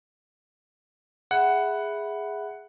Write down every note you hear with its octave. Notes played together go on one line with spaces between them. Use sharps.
G#4 E5 F#5 B5